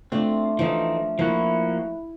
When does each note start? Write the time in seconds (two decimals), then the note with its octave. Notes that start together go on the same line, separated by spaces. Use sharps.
0.12 A3 C4 D4 F4
0.59 E3 F3 A3 D#4 E5 F5
1.19 F3 A#3 E4 F#4